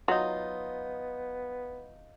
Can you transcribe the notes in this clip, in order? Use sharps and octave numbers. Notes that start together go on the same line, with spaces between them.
F#3 B3 D#4 F4